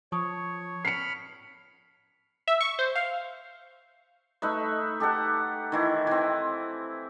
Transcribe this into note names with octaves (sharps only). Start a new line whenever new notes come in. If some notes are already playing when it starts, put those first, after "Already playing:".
F3 C#5 A5 C#6 D#6
B5 F6 C7 C#7
E5
C#6
C5
F5
A3 D#4 B4 E5
G4 A4 F#5
D#3 E3 E4
E3 C4